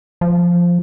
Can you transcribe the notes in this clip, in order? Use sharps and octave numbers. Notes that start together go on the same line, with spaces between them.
F3